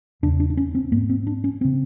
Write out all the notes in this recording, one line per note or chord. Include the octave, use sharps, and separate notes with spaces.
E2 C#3 D4
D4
D4
C#4
C4
G#2 A#3
C4
D4
C#4
C#3 C4